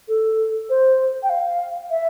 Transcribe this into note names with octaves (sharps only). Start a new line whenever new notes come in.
A4
C5
G5
F5
E5